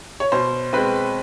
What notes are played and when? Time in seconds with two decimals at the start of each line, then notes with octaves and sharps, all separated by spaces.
0.20 C#5
0.32 B2 C5
0.73 G#3 C4 B4